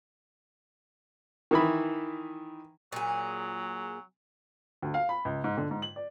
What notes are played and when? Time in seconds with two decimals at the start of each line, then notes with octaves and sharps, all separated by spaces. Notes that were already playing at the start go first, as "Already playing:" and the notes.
1.51 D#3 E3 B5
2.92 A#2 F#3 G#4
4.82 D2
4.94 F5
5.09 B5
5.25 C#2
5.44 G#2
5.58 D3
5.71 G#2
5.82 F#7
5.96 D5